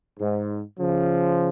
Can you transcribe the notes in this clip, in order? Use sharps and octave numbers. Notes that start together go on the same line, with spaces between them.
G#2
C#3 F3